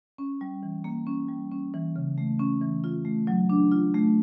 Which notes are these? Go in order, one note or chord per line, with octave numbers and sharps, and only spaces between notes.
C#4
G3
E3
A#3
C#4
G3
C#4
E3
C#3
A3
C#4
E3
F4
A3
F#3
D4
F4
A3